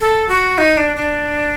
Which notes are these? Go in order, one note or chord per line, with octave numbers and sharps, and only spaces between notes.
A4
F#4
D#4
D4
D4